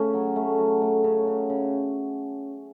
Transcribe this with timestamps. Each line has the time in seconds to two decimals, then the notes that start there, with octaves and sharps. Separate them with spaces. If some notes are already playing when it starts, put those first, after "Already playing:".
Already playing: C#3 A3 C#4
0.14 F#3
0.36 A3
0.58 F#3
0.82 A3
1.04 C#3
1.28 C#3
1.50 C#3